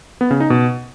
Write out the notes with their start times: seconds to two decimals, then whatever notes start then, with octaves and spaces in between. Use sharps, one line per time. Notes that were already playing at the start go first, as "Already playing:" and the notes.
0.21 B3
0.31 C#3
0.40 D#4
0.50 B2